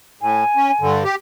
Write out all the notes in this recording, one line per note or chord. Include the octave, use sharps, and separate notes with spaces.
A2 G#5
C#4
G2 D3
G4